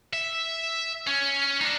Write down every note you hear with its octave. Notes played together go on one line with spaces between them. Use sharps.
E5
C#4
D4 D#4